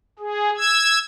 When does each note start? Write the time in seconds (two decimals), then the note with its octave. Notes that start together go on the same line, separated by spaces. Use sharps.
0.19 G#4
0.57 E6 G#6